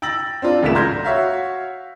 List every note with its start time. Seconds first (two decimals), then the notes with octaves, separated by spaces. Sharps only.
0.02 G5 E6 A6 A#6 F#7
0.42 C4 D4 F4
0.63 G#1 C#2 A3 A#3 B6 E7
0.75 A#5 C6 F6 G6 G#6 A#6
1.04 F#4 C#5 E5 F5